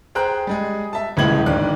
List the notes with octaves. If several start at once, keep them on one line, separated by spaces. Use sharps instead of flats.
G#4 C5 G5 A#5 F#6
G3 G#3 G#4
E5 A5
D#1 C#2 E3 G#3 G#6 F#7
D1 G#1 D#2 D4 D5 F#6